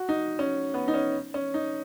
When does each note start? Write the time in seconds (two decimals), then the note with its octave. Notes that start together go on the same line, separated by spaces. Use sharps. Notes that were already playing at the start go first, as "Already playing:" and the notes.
Already playing: F#4
0.09 D#4
0.39 C#4
0.74 B3
0.88 D#4
0.94 C#4
1.34 C#4
1.54 D#4